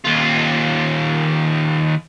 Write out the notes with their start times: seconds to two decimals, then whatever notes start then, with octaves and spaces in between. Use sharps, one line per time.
0.05 D#2 F4